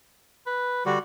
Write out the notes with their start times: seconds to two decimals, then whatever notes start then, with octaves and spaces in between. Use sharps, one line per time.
0.47 B4
0.86 D3 G3 F#4